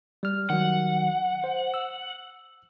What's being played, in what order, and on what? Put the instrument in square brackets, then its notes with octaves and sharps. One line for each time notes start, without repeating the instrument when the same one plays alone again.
[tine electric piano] G3 F6
[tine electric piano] D#3 F#3 [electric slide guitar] F#5
[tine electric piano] C5
E6